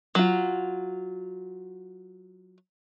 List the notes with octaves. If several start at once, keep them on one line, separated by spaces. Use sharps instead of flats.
F#3 F4